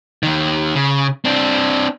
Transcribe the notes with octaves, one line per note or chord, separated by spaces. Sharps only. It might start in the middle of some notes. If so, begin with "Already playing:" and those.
D#2 D#3
C#3
C4 D4